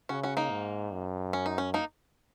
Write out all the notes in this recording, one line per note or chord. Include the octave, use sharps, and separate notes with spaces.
C#3 C#4 F#4
C#4 F#4
A#3 D#4
G#2
F#2
C#4
D#4
C#4
A#3 D#4